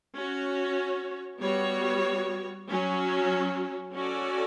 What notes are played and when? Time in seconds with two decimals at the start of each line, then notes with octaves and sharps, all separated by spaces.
0.15 C#4 F#4 C#5
1.41 G3 B3 F#4 C#5
2.69 F#3 C#4 F#4
3.95 C#4 F#4 A4 D5